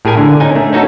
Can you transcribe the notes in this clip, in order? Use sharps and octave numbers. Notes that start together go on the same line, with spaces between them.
A2 G4 G#4 A#4 G#5
D3
C#4 D#4 G#5
A3
C#4 D#4 F#4 A4